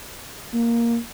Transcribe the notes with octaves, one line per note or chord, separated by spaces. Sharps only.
A#3